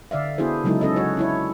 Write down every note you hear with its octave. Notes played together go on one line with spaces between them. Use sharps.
D3 D5 E5 F5
B3 D4 E4 F#4 G#4 C5
C#3 F#3 G#3 D#4 E4 A4
C#4 A4 D#5
F#4 C#5
D4 E4 C#5